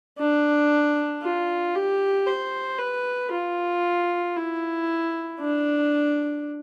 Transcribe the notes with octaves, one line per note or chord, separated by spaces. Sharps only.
D4
F4
G4
C5
B4
F4
E4
D4